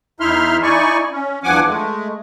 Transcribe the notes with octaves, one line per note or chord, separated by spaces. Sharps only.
E2 D#4 E4 E5 C6 F6
D#4 E4 D5 G#5 C#6
C#4
E2 G2 F3 F#5 G#5 D6
G#3 A3